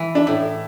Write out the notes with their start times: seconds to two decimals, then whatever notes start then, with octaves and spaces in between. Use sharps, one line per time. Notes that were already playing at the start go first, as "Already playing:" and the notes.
Already playing: E3
0.15 D4
0.27 A2 E4